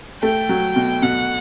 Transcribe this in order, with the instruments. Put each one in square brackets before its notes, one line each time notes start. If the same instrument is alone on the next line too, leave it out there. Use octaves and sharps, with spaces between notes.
[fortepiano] A3 [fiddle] G5
[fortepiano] F#3
B2
[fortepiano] B2 [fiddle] F#5